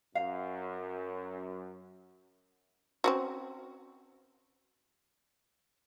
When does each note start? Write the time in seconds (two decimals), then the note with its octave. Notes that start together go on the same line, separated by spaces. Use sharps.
0.15 F#2 F5
3.04 C4 C#4 F#4